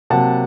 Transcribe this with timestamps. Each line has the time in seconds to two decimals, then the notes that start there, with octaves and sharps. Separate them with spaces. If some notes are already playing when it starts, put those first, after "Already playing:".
0.10 C3 F#3 A#3 F#5 A5